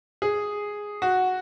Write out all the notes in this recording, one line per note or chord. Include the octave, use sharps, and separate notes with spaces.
G#4
F#4